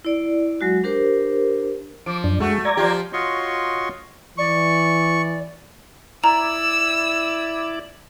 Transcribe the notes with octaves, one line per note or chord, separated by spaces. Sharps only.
E4 D5
F#3 G#3 F#4
D4 G4 A#4 C5
F3 D6
F#2 D4
G#3 A3 F#4
D5 A#5 G#6
F3 F4 G4
F4 F#4 C#5 D#5 C6 C#6
E3 D5 C#6
E4 D5 A#5 E6